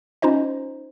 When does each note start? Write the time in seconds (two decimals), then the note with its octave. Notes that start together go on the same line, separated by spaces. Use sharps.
0.22 C#4 D#4 F4 C5 D#5